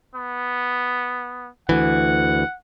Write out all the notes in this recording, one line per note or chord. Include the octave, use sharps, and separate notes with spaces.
B3
D2 E3 F#5